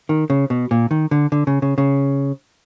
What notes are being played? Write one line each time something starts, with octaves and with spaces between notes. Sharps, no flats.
D#3
C#3
B2
A#2
D#3
D3
D3
C#3
C#3
C#3